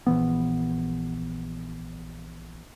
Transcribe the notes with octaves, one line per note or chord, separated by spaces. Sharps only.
A#1 E3 B3